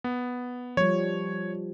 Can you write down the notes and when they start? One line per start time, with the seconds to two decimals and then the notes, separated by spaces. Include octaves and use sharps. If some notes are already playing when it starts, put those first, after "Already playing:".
0.04 B3
0.77 F3 G3 C#5